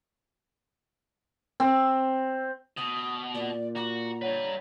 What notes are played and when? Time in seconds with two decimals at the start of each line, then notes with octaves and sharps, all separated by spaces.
1.60 C4
2.77 B2 D#6
3.34 A#2 D5
3.76 F#4 A#5 D6
4.22 G2 B4 C#5 F#5